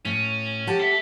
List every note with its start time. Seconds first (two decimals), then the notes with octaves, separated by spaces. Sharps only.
0.05 A2 C#4
0.67 G4 F#5 A5
0.80 A4 E5